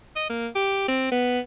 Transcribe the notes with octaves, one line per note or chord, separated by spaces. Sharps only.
D#5
A#3
G4
C4
B3